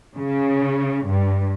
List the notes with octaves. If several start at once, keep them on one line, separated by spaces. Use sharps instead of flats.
C#3
G2